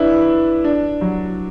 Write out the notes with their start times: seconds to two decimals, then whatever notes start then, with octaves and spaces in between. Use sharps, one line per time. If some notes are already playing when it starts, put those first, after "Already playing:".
Already playing: D4 E4 B4
0.65 D4
1.01 F#3